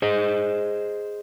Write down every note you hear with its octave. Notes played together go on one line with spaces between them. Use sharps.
G#4 C5 D#5